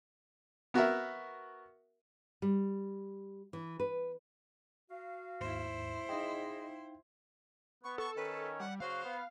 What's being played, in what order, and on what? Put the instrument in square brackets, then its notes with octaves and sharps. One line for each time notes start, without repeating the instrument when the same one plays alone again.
[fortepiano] B3 F#4 A#4 E5
[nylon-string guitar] G3
E3
B4
[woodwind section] F#4 F5
[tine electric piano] D#2 G#2 [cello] E4 C5
[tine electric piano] D#4 F5 G5 [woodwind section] G#4 D#5
[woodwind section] B3 [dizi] C#6
[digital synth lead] A4 [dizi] C#6
[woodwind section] D#3 C#4 [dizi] B4
[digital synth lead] G3 [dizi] F#5
[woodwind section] C#3 F#3 F#4 [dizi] C5 [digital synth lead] F5
[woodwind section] B3